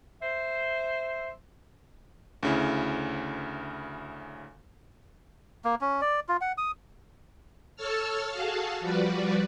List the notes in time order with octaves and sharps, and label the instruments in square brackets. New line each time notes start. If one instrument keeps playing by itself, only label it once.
[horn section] C5 E5
[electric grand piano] D2 C#3 E4
[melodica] A#3
C#4
D5
F4
F#5
D#6
[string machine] A4 C#5 A5 E6 F6
F#4 G#4 A4 F5 A5
F3 G3 F#4 B4 D5